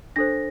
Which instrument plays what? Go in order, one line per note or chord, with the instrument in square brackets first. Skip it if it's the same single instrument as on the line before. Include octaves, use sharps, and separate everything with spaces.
[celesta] D4 A4 C5 A#6